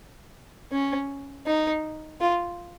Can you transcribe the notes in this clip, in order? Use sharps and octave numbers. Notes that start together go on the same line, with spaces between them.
C#4
D#4
F4